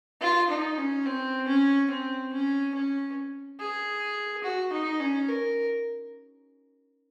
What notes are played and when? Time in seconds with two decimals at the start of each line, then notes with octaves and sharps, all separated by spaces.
0.21 F4
0.50 D#4
0.78 C#4
1.06 C4
1.48 C#4
1.90 C4
2.33 C#4
2.74 C#4
3.60 G#4
4.44 F#4
4.73 D#4
5.00 C#4
5.28 A#4